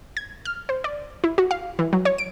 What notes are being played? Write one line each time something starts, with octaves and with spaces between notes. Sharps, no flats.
G#6
F6
C5
D5
E4
F#4
F5
E3
F#3
C#5
D7